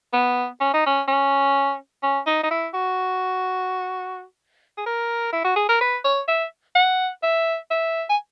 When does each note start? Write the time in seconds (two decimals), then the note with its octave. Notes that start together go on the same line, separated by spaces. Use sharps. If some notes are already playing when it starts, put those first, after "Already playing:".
0.13 B3
0.60 C#4
0.74 D#4
0.86 C#4
1.08 C#4
2.03 C#4
2.26 D#4
2.43 D#4
2.51 E4
2.74 F#4
4.78 G#4
4.86 A#4
5.32 E4
5.44 F#4
5.56 G#4
5.69 A#4
5.81 B4
6.04 C#5
6.28 E5
6.75 F#5
7.23 E5
7.71 E5
8.09 G#5